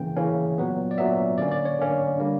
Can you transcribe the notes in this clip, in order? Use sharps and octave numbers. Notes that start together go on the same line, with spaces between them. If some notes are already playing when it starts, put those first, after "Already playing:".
Already playing: C#3 E3 A#3 C#4 G5
C#3 E3 A#3 C#4
A#2 F#3 B3
D5
A#2 F#3 B3 E5
D3 A#3 C#4 D5
D5
C#5
D3 A#3 C#4
D3 G3 A#3 D4